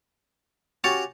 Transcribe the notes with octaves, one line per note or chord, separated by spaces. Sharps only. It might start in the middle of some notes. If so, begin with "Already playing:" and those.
C#4 F#4 G4 C#6 A6 F7